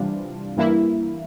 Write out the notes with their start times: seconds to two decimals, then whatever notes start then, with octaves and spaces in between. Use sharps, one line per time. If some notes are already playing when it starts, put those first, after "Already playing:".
Already playing: C3 E3 G3 D4 F4
0.57 G2 E3 A#3 E4